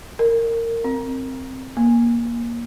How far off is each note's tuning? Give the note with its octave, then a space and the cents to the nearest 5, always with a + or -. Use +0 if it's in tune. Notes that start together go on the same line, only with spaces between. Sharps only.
A#4 -20
C4 +5
A#3 +15